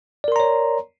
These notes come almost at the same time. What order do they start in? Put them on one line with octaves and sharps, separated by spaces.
D5 A#4 C6 A#5 C#5